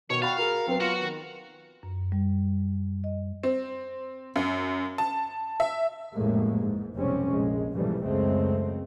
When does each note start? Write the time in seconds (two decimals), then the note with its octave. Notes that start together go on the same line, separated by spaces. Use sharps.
0.10 B2 D#3 C#5
0.22 F#4 F5 G5 B5 A6
0.38 F#4 G#4 A#4
0.67 F#3 B3 C4
0.80 F4 F#4
0.99 D#3
1.83 F#2
2.12 G3
3.04 D#5
3.43 C4
4.36 F#2
4.98 A5
5.60 E5
6.14 A1 F2 A2 G#3 A#3
6.59 G#2
6.96 F1 B1 G3 C4 C#4
7.30 A#1 G#3
7.74 B1 G#2 E3 F3 G3 A3
8.03 C#2 F#2 C#3 G#3 A3 C4